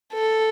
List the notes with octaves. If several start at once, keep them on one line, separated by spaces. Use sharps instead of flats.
A4